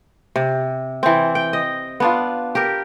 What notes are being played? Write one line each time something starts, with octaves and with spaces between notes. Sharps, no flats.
C3
E3 C4
G5
D#5
B3 D4 F4
G4 A#4